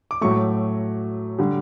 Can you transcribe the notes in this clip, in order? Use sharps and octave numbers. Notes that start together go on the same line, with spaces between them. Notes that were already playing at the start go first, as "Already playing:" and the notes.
D6
A2 F#3 A3 C#6
D3 G3